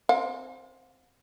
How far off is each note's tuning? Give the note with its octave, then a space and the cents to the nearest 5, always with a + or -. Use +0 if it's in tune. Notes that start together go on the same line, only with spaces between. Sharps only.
C4 +0 F5 +40